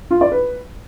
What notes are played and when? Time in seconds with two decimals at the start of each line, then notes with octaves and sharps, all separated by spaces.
0.11 F4
0.21 D5
0.32 B4